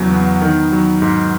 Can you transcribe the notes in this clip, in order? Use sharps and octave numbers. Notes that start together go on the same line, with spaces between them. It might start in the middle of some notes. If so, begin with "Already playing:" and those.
Already playing: E2 C#3 F#3
B3
D#3
F#3
G#2